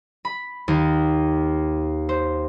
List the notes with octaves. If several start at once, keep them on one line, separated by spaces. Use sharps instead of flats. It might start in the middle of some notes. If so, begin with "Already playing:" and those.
B5
D#2
C5